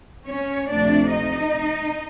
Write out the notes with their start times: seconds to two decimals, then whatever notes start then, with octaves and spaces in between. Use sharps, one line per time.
0.28 C#4 C#5
0.69 D2 C3 F3 A3 D4 D5
1.11 D#4 D#5